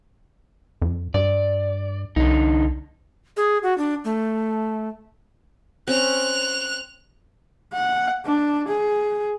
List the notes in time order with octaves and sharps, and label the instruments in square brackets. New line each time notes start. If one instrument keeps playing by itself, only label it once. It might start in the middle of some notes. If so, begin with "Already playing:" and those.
[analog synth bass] F2
[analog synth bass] G2 [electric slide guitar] D5
[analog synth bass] C2 [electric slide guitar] D3 D#4
[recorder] G#4
F#4
D4
A3
[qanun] C4 C#4 [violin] F#6 F7
[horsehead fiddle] F#5
D4
G#4